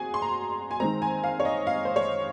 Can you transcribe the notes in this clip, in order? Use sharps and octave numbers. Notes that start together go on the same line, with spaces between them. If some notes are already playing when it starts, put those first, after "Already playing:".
Already playing: C4 F#4 G#4 G#5
C6
A#5
G#5
D#3 G#3 C4 A#5
G#5
F5
C#5
D#5
F5
C5
C#5